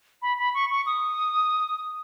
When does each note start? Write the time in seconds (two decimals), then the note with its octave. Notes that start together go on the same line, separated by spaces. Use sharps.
0.22 B5
0.39 B5
0.54 C#6
0.70 C#6
0.87 D#6